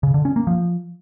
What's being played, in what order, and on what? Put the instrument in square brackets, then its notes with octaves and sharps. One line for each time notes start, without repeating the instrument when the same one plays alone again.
[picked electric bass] C#3
D3
C#4
A#3
F3